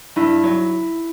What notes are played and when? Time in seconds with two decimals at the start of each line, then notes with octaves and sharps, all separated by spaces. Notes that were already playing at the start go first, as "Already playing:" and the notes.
0.16 G2 E4
0.44 F#3